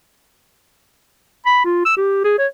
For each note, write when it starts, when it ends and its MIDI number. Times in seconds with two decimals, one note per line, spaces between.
1.46 1.61 83
1.65 1.84 65
1.85 1.95 88
1.97 2.24 67
2.24 2.38 68
2.39 2.47 73